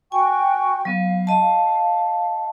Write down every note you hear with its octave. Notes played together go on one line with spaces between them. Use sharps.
F#4 G5 G#5 C#6
F#3 B3 F5
D#5 A5